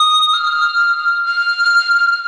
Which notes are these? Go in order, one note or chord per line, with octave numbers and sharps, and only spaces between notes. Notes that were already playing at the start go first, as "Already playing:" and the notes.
Already playing: D#6
F6
F6